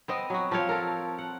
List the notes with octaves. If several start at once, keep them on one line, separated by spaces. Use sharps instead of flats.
B3 C4 D#5
F#3 F#4
F3 C4 F4 C#5
A4 A#4
F#5